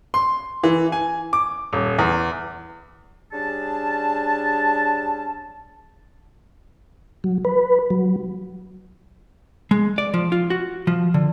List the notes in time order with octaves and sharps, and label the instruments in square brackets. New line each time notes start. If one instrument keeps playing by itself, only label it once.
[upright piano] C6
E3
G#5
D6
D#1
E2
[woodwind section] G3 C#4 D4 G#4 A5
[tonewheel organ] F#3
B4
F#3
[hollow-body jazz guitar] G#3
D5
F3
F4
F#4
F3
D3